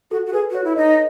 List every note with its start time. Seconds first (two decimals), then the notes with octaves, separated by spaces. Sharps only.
0.11 F#4 A4
0.26 F#4
0.33 G#4 B4
0.51 F#4 C#5
0.64 E4
0.76 D#4 D#5